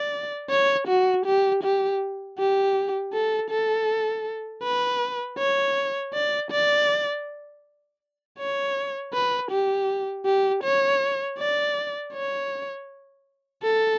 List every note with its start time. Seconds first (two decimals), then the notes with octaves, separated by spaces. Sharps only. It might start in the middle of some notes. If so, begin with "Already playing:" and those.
Already playing: D5
0.50 C#5
0.88 F#4
1.26 G4
1.63 G4
2.38 G4
3.13 A4
3.50 A4
4.63 B4
5.38 C#5
6.13 D5
6.51 D5
8.39 C#5
9.13 B4
9.51 G4
10.26 G4
10.63 C#5
11.39 D5
12.13 C#5
13.63 A4